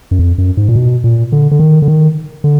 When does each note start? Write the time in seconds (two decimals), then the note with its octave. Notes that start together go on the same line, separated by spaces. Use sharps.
0.11 F#2
0.19 F2
0.38 F#2
0.57 G#2
0.69 A#2
0.76 B2
1.04 A#2
1.32 D3
1.51 D3
1.59 D#3
1.82 D3
1.88 D#3
2.44 D3